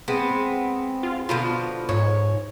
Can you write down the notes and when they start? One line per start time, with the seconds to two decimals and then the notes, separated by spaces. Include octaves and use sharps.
0.08 G#3 B3 C4
1.03 F4
1.29 B2 D3 F3 F4
1.89 G#2 C#5